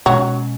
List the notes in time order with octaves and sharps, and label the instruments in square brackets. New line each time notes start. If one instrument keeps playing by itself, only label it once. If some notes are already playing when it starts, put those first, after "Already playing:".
[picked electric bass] B2 G#3 C#4 [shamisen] F#3